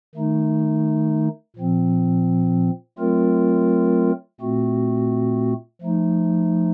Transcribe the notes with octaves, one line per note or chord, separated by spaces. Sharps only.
D#3 A3 D#4
A#2 F3 C4
F#3 A3 C4 F4 A#4
A#2 A3 C4 F#4
F3 A3 D#4